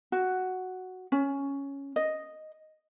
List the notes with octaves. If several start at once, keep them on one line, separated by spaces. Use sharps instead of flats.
F#4
C#4
D#5